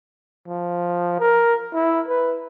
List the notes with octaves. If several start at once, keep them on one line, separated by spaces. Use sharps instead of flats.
F3
A#4
E4
B4